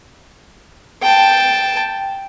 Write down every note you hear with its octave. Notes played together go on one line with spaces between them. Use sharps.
G5 A5